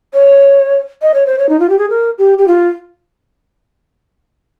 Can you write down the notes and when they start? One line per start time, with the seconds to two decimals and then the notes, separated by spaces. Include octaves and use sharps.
0.14 C#5
1.02 D#5
1.14 C#5
1.27 C5
1.38 C#5
1.49 D#4
1.60 F4
1.69 G4
1.79 G#4
1.90 A#4
2.18 G4
2.38 G4
2.48 F4